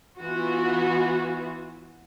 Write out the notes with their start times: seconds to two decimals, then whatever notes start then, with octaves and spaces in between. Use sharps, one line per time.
0.18 E3 B3 F4 F#4